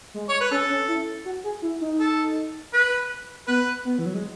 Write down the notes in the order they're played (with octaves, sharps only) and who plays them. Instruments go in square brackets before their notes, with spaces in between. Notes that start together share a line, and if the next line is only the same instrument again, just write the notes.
[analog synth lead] G#3
[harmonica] C#5
B4
[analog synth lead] C#4 [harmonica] A4
[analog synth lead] C#4
E4
F#4
G#4
E4
D#4
[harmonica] A4
B4
[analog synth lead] B3 [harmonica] B4
[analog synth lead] B3
E3
F#3
G#3